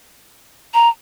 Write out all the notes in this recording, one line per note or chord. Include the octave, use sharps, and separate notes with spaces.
A#5